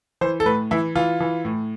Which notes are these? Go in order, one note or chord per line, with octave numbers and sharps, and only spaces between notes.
E3 C5
A4
A2 B4
E3 E4
E3 F4
E3
A2